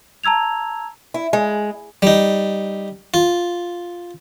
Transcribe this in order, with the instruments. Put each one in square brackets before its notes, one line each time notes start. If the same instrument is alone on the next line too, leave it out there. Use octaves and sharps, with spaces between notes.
[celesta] A5 A#5 E6 G#6 F7
[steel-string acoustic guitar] E4
G#3
[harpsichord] G3 D#4
F4